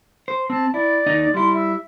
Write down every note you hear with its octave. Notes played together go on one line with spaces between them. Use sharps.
C5
C4 A5
E4 D5
D#2 D#4 D#5
G3 E4 C6
E5